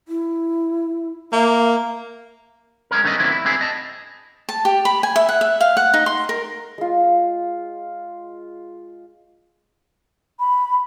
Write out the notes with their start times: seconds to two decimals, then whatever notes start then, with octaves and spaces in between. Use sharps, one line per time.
0.08 E4
1.32 A#3 E5
2.91 G#3 C#4 A#4
3.03 G2 D#3 A3 B3 C#4 D#5
3.19 D3 D#3 F3 A#3 C4 E4
3.32 E4
3.45 C4 D4 E4 G#4
3.61 D#5 A5
4.49 A5
4.65 G4
4.85 B5
5.03 G#5
5.16 E5
5.29 F#5
5.41 E5
5.61 F5
5.77 F#5
5.94 D#4
6.06 C6
6.29 A#4
6.78 G#3 F4
10.40 B5